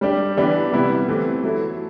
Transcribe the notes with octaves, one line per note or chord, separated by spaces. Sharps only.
G3 D4 G4
E3 B3 D4 G4
C3 G3 B3 E4
E3 A3 C4 G4
F#3 A3 E4 A4